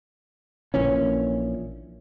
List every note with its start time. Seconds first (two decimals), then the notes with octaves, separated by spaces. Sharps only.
0.74 A#1 A#2 E3 C#4